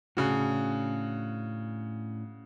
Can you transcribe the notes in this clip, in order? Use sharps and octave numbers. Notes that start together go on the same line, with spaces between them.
A2 C#3 C#4 D4 F#4